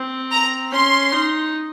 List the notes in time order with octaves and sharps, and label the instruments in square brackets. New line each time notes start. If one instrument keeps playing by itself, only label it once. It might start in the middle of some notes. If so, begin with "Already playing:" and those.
Already playing: [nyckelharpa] C4
[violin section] A#5
[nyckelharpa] C#4 [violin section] C6
[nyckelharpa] D#4